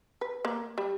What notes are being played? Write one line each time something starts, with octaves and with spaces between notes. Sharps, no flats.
B4
A#3
G3